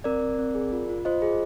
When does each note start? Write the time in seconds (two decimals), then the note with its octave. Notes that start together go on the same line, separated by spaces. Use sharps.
0.04 C4 A#4 D5
0.21 C4
0.39 C4
0.55 G#4
0.72 F4
0.89 F4
1.05 F4 C5 D#5
1.22 G#4